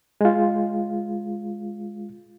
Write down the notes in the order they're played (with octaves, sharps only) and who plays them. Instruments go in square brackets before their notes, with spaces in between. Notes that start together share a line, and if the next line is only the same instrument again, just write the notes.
[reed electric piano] G#3 F4